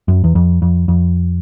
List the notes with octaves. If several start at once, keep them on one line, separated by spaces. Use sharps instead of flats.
F#2
E2
F2
F2
F2